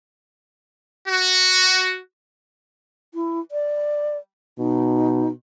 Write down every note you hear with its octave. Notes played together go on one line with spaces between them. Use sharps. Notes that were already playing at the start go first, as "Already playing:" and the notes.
F#4
E4
D5
B2 D#4